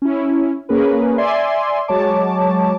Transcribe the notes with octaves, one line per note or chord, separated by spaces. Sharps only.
C#4 E4
A#3 C#4 G#4 A#4 B4
D5 E5 G#5 C6
F#3 G#3 C#5 A5 D6